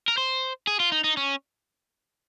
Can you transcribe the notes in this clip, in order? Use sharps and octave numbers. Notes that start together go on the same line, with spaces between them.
A#4
C5
G#4
F4
D#4
D#4
C#4